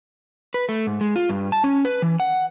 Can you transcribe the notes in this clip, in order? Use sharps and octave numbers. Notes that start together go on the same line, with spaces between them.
B4
A3
G#2
G#3
F4
G2
A5
C#4
B4
E3
F#5